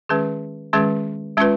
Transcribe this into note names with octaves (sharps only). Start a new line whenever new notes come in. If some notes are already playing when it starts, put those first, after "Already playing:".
D#3 G#3 C#4 G#4 B4
D#3 G#3 C#4 G#4 B4
G#3 C#4 F4 B4